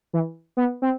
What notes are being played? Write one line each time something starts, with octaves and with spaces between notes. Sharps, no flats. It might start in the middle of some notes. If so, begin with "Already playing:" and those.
E3
B3
C4